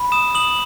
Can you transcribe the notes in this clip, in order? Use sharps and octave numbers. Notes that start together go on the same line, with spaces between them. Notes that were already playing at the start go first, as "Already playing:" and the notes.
Already playing: B5
D#6 E7
D#6 F#7